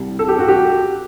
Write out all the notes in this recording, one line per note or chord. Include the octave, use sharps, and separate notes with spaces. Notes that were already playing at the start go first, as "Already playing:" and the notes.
Already playing: C2 C3 G3
A4
G4
F#4
G4